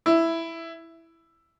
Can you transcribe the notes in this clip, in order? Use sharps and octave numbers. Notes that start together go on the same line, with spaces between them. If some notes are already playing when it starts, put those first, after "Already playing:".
E4